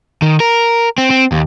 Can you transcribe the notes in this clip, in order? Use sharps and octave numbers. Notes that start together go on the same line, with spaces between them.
D#3
A#4
C4
C4
D#2